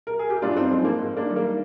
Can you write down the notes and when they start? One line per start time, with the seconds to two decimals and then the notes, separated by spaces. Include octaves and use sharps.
0.07 A#4
0.19 G#4
0.30 G4
0.42 G2 D4 F4
0.56 C4 D#4
0.71 F3 G#3 C4
0.84 A#3
0.99 G#2
1.17 A#3 D4
1.27 D#3 G3
1.36 A#3